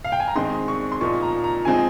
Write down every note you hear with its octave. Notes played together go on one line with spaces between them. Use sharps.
F5
G5
G#5
A#5
G#2 D#3 G#3 C4 D#4 C6
C#6
C6
A#2 F3 A#3 D#4 C#6
A#5
A#5
F3 G#3 C4 D#4 G#5